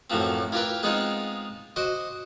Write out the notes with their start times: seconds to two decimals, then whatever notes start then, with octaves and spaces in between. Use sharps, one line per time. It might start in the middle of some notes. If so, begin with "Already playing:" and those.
0.10 F#2 A2 E3 F3 C4
0.52 E4 F4 G4 A#4 B4
0.83 G#3 B3 C4 D#4 F4 G#4
1.76 F#4 C5 D#5 D6